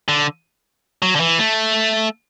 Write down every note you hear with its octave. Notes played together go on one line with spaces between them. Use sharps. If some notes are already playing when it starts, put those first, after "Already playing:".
D3
F#3
D3
E3
A3